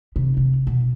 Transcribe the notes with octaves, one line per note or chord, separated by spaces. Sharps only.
C3
C3
B2